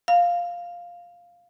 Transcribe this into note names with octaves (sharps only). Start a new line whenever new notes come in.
F5